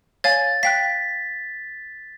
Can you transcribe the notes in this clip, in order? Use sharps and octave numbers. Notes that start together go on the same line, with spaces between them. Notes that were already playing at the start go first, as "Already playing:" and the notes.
C#5 F5 G#5 A6
F5 G5 F#6 B6